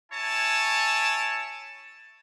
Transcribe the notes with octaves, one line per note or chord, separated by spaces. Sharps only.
E4 C#5 G#5 A5